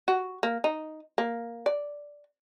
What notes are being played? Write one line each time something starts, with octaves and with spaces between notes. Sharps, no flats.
F#4
A#3
D#4
A#3
D5